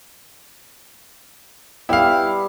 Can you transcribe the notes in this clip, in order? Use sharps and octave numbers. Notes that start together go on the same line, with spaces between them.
G3 B3 E4 F5